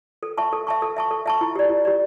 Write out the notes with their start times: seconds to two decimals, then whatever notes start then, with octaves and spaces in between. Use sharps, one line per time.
0.23 A4
0.38 E5 A5 C#6
0.53 A4
0.67 E5 A5 C#6
0.82 A4
0.97 E5 A5 C#6
1.11 A4
1.26 E5 A5 C#6
1.41 E4
1.55 G4 D5
1.69 E4
1.85 G4 D5